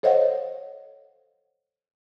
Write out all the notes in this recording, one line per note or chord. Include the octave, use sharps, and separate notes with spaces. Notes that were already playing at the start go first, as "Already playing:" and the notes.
A4 C5 C#5 D#5 F5 F#5